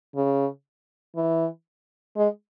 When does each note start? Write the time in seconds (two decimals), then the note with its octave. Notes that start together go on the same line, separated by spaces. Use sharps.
0.16 C#3
1.16 E3
2.17 G#3